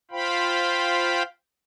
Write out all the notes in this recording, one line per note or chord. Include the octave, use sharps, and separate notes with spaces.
F4 C5 F5 G5 B5